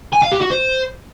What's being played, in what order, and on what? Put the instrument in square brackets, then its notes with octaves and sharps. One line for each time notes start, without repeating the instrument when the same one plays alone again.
[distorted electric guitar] G#5
F5
G4
F#4
C5